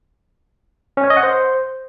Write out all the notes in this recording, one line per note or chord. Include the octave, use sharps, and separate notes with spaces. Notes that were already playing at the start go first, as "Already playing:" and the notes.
C#4
C#5
D#5
F#5
C5